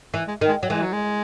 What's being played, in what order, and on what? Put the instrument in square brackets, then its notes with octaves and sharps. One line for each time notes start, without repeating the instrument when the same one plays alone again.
[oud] E3
[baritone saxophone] G#3
[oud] D#3
[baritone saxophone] G#3
[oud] F#3
[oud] E3 [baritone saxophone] G#3
[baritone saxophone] F#3
G#3